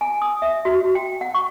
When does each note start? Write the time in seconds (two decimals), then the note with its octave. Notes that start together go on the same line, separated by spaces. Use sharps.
0.01 G#5
0.22 D#6
0.42 E5
0.65 F#4
0.80 F#4
0.95 G5
1.21 F#5
1.34 C#6